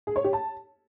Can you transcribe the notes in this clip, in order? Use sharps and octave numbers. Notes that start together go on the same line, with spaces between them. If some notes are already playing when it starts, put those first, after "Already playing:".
G#4
C#5
G4
A5